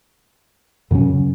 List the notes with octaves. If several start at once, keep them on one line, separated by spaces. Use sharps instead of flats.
F#2 C#3 F#3 C#4